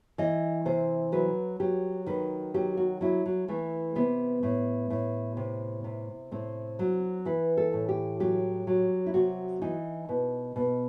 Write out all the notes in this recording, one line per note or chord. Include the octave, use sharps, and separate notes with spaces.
E3 D#5
C3 C5
F#3 B4
F#3 G4
D#3 B4
F#3 G4
F#4
F#3 E4
F#3
E3 A3
C3 B3
A2
A2
C3
C3
A2 C4
F#3
E3 B4
A4
A2
G4
F#3 G4
F#3
E4
C3 F#4
E3 D#4
B2
B2